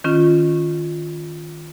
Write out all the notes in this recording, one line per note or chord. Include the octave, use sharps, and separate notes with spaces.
D#3 C#4 F4